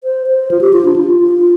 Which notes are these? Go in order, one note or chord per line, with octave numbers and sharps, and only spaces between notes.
C5
C5
F4
G4
F4
D4
F4
F4